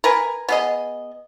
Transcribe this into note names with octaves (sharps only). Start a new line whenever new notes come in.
A#4 B4 G#5
B3 G#4 D#5